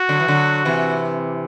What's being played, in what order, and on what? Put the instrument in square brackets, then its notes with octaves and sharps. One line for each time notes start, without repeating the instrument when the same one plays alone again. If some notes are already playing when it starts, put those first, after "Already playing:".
Already playing: [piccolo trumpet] F#4
[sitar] D3 F#3
E3
D3 F#3
C3 E3